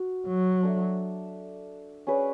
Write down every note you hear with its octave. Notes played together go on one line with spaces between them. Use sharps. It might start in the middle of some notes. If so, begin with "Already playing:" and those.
Already playing: F#4
F#3
D4 A4 E5
C#4 G#4 B4 D5